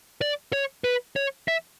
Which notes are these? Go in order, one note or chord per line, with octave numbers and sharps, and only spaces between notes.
D5
C#5
B4
C#5
E5